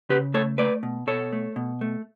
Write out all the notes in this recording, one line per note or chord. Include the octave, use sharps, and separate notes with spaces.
C#3 G4 B4
A3 A4 C#5
A3 B4 D5
B2
B2 A4 C#5
A3
B2
A3